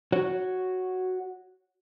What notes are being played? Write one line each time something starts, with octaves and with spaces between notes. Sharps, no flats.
F#4 C#5